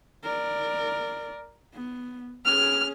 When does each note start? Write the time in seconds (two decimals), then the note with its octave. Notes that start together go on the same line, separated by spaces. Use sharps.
0.24 A#4 D5
1.74 B3
2.46 C#4 G#4 F6